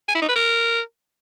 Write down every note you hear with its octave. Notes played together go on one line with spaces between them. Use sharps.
G#5
E4
D#4
B4
A#4